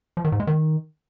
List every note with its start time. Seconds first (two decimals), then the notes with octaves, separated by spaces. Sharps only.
0.17 F3
0.25 D#3
0.32 G#2
0.40 G#3
0.47 D#3